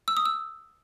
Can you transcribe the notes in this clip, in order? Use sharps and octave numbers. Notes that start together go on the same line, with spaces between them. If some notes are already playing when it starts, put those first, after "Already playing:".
E6
D#6
E6